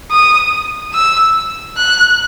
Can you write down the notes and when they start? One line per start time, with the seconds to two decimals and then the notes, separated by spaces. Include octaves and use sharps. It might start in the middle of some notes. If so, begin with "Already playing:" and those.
0.11 D#6
0.93 E6
1.77 F#6